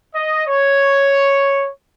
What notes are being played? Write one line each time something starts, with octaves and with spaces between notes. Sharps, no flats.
D#5
C#5